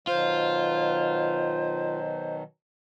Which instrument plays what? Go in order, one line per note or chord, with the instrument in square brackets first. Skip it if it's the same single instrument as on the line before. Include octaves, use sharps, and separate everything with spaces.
[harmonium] B2 D#3 F#3 [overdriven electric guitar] F4 [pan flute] C5